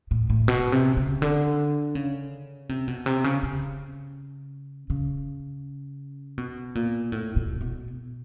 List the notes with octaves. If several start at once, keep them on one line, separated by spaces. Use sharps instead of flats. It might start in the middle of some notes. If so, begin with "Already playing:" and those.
A2
A2
B2
C3
C#3
D3
C#3
C3
B2
C3
C#3
C#3
C#3
B2
A#2
A2
B2
B2